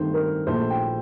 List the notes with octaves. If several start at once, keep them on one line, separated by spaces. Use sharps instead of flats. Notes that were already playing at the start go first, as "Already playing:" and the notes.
Already playing: G2 D#3 A3 C4 C5
A#4
A#1 A#2 A3 C5
G5